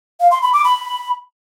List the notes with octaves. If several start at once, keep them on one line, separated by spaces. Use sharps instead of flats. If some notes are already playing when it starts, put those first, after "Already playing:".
F5
C6
B5
D6
B5